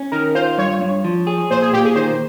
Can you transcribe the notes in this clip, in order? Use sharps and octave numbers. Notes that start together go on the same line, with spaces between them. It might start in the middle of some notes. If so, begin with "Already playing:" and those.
Already playing: C#4
D#3 A#4
F4 C5
G2 C#5
G2
F3
G#4
A#2 C5
G#4
A#2 G4
G#4
D#3 C5